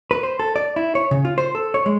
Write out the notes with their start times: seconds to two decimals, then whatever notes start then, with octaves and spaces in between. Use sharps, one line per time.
0.11 B4
0.23 C5
0.39 A4
0.56 D5
0.76 E4
0.95 C#5
1.11 C#3
1.25 F4
1.38 C5
1.55 A4
1.74 C#5
1.86 G#3